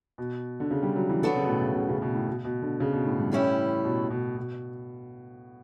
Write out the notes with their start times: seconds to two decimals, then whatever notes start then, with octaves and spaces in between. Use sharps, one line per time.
0.18 B2
0.60 D3
0.71 C#3
0.83 G3
0.96 F#3
1.09 E3
1.22 D3 F#3 B3 F#4 A4 D5
1.36 C#3
1.44 B2
1.49 A2
1.62 C#3
1.75 C#3
1.88 C#3
2.02 B2
2.15 A2
2.28 B2
2.44 B2
2.62 D3
2.80 C#3
2.93 B2
3.06 A2
3.19 G2
3.32 A2 E3 G3 C#4 E4 G4
3.84 B2
4.10 B2
4.37 B2